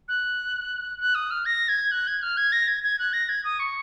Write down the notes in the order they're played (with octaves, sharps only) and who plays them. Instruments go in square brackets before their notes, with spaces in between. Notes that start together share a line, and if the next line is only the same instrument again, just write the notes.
[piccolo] F#6
F#6
D#6
F6
A#6
G#6
F#6
G#6
F6
G#6
A#6
G#6
G#6
F#6
A#6
G#6
D#6
C#6